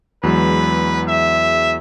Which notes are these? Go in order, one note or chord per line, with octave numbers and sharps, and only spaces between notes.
E2 F#3 G#3 B4
E5